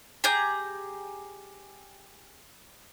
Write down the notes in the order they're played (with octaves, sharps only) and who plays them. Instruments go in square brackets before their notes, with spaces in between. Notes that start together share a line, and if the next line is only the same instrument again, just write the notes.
[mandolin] G4 G#4 A#5 G6